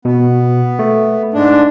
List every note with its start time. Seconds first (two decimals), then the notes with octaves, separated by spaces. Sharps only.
0.05 B2 B3
0.79 A3
1.34 G#2 G#3 D4